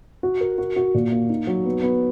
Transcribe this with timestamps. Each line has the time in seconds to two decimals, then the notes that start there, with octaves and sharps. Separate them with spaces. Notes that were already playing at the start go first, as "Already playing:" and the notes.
0.23 F#4
0.41 A#4
0.58 F#4
0.76 F#4
0.94 A#2
1.12 A#3
1.29 D#4
1.47 F#3
1.65 B3
1.83 B3